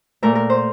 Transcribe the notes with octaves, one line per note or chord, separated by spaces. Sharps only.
A#2 A3 A#4
A#4
C5